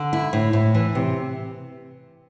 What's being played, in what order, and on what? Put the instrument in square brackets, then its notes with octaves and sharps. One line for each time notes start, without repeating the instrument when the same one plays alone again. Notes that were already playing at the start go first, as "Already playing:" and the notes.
Already playing: [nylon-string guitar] D3
E4
A2
A2
E3
C3